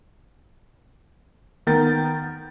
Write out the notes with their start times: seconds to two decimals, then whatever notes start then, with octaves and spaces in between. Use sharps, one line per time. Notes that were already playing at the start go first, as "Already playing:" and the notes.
1.67 D#3 B3 A#4 G6 A6